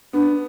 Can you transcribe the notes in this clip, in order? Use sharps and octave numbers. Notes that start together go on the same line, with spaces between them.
B3 D4